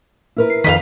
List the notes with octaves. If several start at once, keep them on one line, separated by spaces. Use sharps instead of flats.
E4 A#4 B4
C7
F2 D#3 B4 D#5 F5